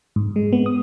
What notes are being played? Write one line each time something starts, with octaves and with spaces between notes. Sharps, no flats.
G#2
G#3
B3
D#6